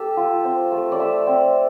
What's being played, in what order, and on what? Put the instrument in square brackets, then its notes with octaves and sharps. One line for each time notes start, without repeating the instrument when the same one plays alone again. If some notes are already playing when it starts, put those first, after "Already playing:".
Already playing: [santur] A3 G4 A4
F4
C4
A3
D5
A3 E5
C4